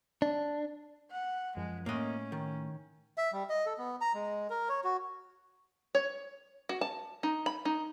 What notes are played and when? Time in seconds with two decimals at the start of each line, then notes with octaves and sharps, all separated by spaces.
0.22 D4
1.11 F#5
1.57 F#2 F3 G#3
1.86 A2 A#3 C#4 D#5
2.32 D#3
3.18 E5
3.33 G3
3.49 D#5
3.66 A4
3.78 B3
4.01 A#5
4.14 G#3
4.50 A#4
4.69 C#5
4.84 F#4
5.95 C#5
6.69 F#4
6.81 A5
7.23 D#4
7.46 B5
7.65 D#4